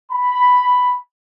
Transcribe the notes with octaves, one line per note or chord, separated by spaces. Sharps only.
B5